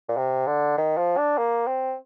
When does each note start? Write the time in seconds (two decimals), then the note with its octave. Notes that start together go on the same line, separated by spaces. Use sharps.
0.09 A#2
0.17 C3
0.47 D3
0.78 D#3
0.98 F3
1.18 D4
1.38 A#3
1.67 C4